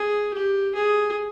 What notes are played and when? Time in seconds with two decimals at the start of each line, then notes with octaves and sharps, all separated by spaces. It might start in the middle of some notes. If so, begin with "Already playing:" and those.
Already playing: G#4
0.33 G4
0.75 G#4